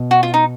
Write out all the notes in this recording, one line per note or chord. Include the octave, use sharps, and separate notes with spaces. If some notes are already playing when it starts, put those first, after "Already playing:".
Already playing: B2
F#4
F4
D#4